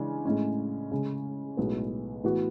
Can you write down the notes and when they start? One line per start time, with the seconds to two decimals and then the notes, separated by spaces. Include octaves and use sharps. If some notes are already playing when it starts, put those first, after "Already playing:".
Already playing: C#3 E3 G#3 D4
0.25 A2 G#3 C#4
0.91 C#3 G#3 C#4
1.57 B1 A2 G#3 B3
2.24 A2 E3 B3 F#4